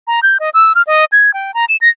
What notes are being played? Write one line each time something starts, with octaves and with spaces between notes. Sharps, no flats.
A#5
G6
D#5
E6
F6
D#5
G#6
G5
A#5
E7
A#6